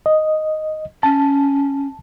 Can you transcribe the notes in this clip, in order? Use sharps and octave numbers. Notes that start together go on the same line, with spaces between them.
D#5
C#4 A5